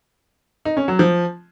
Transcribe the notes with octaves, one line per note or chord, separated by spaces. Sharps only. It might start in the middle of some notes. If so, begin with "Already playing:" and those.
D#4
C#4
F#3
F3